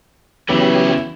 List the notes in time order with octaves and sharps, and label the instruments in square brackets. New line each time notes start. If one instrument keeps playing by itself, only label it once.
[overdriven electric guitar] C#3 E4 [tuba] E3 [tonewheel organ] F#3 G4 [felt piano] B3